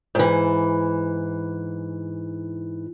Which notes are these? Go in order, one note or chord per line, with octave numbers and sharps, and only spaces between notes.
G#2 E3